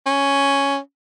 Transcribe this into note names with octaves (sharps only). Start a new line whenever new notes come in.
C#4